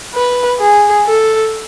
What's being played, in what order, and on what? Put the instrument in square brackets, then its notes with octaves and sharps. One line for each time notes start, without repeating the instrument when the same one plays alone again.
[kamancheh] B4
G#4
A4